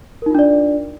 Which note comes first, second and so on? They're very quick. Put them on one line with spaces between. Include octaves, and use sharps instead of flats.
A#4 D#4 F4 D4 D5